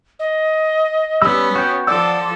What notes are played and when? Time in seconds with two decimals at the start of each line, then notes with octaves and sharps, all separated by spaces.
0.19 D#5
1.22 G3 B3 C#4 B5 E6
1.56 F#4 G5
1.87 F3 A4 D5 F#5 D6 E6